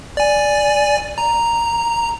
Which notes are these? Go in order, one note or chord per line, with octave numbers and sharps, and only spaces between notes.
D5 G#5
A#5